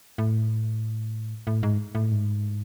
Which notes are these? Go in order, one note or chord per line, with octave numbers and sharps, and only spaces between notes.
A2
A2
G#2
A2
G#2